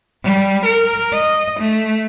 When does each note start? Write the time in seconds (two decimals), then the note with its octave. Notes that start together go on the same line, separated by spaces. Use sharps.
0.23 G3
0.65 A#4
1.13 D#5
1.60 A3